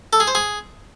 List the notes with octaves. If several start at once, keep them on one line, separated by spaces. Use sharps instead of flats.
A4
G#4
C5
G#4